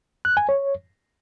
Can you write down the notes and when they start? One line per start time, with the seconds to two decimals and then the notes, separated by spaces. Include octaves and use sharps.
0.25 F#6
0.37 G#5
0.49 C#5